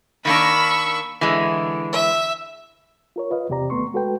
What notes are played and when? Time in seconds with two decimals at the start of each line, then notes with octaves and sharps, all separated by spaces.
0.25 D#3 A#3 D4 B5 C#6 E6
1.21 D3 E3 G#3
1.92 E5
3.16 F4 A#4 C#5
3.30 F4 B4 D#5 F5
3.49 E2 C3 C4 G4 D5 A#5
3.70 D#2 A3 B3 C6 C#6
3.93 G#3 F#4 A4 B4 G5